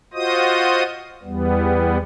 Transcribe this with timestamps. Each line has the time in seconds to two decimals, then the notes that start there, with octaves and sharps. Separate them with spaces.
0.14 F4 F#4 C5 D#5 D#6
1.23 E2 G3 B3